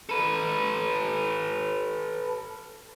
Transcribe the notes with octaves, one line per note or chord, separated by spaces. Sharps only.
A4 B4